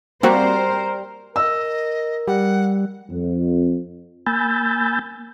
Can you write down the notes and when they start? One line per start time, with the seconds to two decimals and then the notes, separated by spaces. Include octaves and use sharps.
0.23 G3 A#3 C4 F#4 A#4 C5
1.36 A#4 D#5 E6
2.28 G3 F#5
3.10 F2
4.27 A#3 G#5 B5 E6 G6 A6